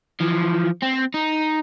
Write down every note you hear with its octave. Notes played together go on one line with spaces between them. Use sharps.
E3 F3
C4
D#4